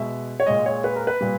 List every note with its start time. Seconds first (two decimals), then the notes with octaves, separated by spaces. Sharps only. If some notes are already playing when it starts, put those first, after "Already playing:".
Already playing: B2 G#3 E5
0.40 C#5
0.46 A#2 G#3 D#5
0.66 C#5
0.84 B4
0.96 A#4
1.07 B4
1.21 A#2 G3